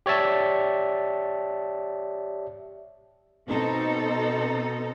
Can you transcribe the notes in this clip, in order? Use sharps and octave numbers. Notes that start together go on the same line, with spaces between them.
G4 C#5 D5 E5 A5
B2 C4 D#4 A4